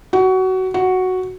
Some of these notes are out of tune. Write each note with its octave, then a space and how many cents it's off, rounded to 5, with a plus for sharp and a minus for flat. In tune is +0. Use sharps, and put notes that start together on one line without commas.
F#4 +20
F#4 +0